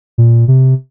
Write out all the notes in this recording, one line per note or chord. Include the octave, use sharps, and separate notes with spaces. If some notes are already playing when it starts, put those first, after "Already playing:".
A#2
C3